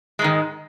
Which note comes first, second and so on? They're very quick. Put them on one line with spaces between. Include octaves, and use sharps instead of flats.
G#3 G#2 D#3